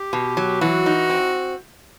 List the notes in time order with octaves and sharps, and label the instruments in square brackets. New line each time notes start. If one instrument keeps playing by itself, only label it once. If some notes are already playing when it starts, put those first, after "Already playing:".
Already playing: [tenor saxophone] G4
[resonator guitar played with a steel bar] B2
F#3
[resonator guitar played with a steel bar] E3 [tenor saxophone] F#4
[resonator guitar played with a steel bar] D#4
C4